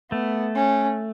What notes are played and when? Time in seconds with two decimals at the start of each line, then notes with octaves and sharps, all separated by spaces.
0.11 A3 B3
0.55 C#4